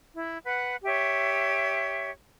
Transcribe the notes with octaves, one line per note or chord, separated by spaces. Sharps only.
E4
B4 F#5
G4 C#5 E5